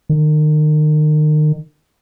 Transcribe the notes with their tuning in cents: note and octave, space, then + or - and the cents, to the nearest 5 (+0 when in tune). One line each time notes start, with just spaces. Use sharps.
D#3 -35